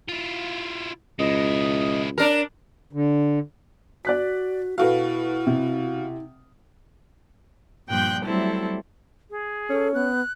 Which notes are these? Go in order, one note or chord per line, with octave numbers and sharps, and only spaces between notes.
E4 F4
C#2 G#3 E4 D#5
D4 A#4
D3
F#4 D5 F#6 B6
B2 E4 F#4 A4 B4 F5
C3
G2 A#2 F3 G5 F#6 G6
F#3 G3 A3 C4 E4 A4
G#4
C#4 A4
B3 F#6